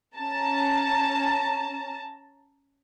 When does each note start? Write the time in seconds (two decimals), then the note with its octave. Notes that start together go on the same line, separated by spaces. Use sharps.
0.15 C#4 A5 A#5